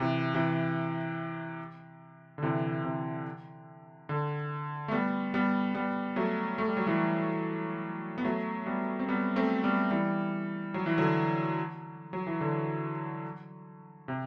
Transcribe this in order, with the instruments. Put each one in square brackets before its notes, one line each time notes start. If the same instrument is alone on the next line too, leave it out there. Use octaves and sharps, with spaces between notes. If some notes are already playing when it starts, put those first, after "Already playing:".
Already playing: [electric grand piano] C3 E3
C3 E3
D3
C3 E3
C3
D3
A3
G3 B3
G3 B3
G3 B3
F#3 A3
A3
G3
F#3
E3 G3
B3
F#3 A3
G3 B3
C4
G3 B3
A3 C4
G3 B3
E3 G3
F#3
E3
D3 F#3
F#3
E3
D3
C3